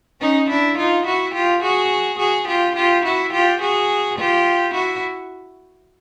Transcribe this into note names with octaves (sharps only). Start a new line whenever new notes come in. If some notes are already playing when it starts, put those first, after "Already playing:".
C#4 D#4
D4 E4
D#4 F4
E4 F#4
F4 G4
F#4 G#4
F#4 G#4
F4 G4
F4 G4
E4 F#4
F4 G4
F#4 G#4
F4 G4
E4 F#4